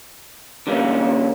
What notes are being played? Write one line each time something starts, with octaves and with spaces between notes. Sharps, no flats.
D3 G3 A#3 C#4